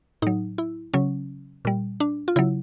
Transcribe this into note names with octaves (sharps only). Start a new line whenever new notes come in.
A2 F#3 D#4
E4
C#3 F#3 C#4
A#2 G3
D4
F4
C#3 F#3 E4